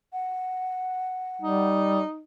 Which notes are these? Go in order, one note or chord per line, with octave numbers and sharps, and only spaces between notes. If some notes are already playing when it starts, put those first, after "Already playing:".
F#5
G3 D#4